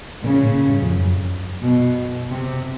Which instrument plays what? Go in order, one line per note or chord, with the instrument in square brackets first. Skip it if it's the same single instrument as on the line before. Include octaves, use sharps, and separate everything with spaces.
[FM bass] A#2 [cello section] C#3
[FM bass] G#2
A2
G2
F2
F#2
[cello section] B2
C3